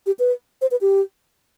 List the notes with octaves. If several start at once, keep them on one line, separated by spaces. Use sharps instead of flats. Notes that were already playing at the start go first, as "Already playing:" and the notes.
G4
B4
C5
B4
G4